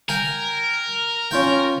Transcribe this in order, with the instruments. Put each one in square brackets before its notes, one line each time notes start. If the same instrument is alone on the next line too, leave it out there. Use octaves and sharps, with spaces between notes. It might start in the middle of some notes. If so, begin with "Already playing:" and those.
[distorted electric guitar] A#4 [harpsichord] G5 G#5
[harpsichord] C#4 F4 G5